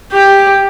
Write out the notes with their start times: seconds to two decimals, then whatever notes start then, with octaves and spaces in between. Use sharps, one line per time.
0.11 G4